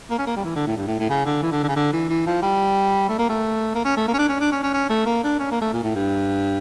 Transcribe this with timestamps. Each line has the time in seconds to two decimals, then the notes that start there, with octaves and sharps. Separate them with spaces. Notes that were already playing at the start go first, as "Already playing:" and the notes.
0.11 A#3
0.19 C#4
0.27 A#3
0.36 G3
0.44 E3
0.56 D3
0.67 A2
0.77 G2
0.87 A2
1.00 A2
1.10 C#3
1.26 D3
1.42 E3
1.52 D3
1.63 D3
1.68 C#3
1.76 D3
1.93 E3
2.09 E3
2.26 F3
2.42 G3
3.09 A3
3.19 A#3
3.29 A3
3.75 A#3
3.85 C#4
3.97 A3
4.08 A#3
4.14 C#4
4.18 D4
4.29 C#4
4.40 D4
4.52 C#4
4.63 C#4
4.74 C#4
4.90 A3
5.06 A#3
5.24 D4
5.39 C#4
5.51 A#3
5.61 A3
5.73 A#2
5.84 A2
5.95 G2